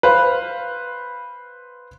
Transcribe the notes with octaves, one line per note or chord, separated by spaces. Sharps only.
B4 C5 F5